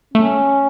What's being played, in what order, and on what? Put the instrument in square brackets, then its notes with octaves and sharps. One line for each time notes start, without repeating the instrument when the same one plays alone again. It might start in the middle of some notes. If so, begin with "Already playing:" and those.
[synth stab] A3 [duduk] C#4